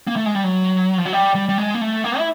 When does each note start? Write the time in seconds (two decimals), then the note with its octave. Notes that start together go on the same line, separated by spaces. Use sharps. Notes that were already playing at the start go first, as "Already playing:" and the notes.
0.07 A#3
0.16 A3
0.26 G#3
0.35 G3
0.44 F#3
0.98 F3
1.05 F#3
1.13 G3
1.35 G3
1.49 G3
1.58 G#3
1.74 A#3
1.81 A3
2.04 A#3
2.18 E4